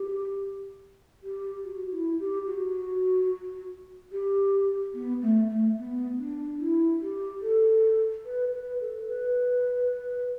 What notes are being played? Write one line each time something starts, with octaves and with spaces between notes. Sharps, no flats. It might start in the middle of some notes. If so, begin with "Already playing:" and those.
Already playing: G4
G4
F#4
E4
G4
F#4
G4
B3
A3
A3
B3
D4
E4
G4
A4
B4
B4
A4
B4